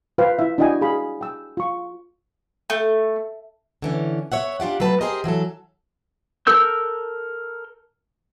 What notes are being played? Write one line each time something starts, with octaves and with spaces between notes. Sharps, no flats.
F4 B4 C5 F5 G5
E4 E5
D4 E4 F#4 D#5 G5 G#5
G#4 F5 B5
G5 E6
F4 C#6
A3
D3 E3 C#4
C#5 E5 F#5
D4 F4 G4 F#5
F#3 A3 B4 A5
G4 G#4 A#4 C5 D#5
E3 F#3 A3 A4
A4 A#4 E6 G6